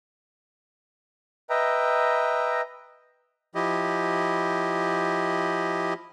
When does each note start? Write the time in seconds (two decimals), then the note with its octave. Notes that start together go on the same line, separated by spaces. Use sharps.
1.50 B4 D#5 E5 G5 A#5
3.55 F3 E4 G4 D#5